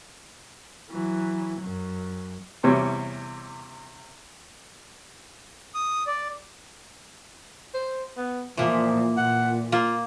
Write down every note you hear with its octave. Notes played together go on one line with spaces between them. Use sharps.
E3 F#3
F#2
A1 E2 C3 G3 C#4
D#6
D5
C5
B3
A#2 E3 F3 A#3
A#2 F#5
A#3 F4